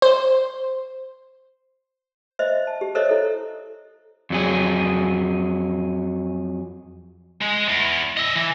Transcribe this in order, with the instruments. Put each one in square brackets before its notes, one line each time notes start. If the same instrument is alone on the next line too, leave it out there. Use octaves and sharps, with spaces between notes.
[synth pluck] C5
[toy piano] C5 D#5 E5
A5
G4
A4 A#4 C5 C#5 D#5 E5
E4 A4
[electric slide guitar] F2 F#3 G#4
[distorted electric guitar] G#3
E2
D#5 E5
E3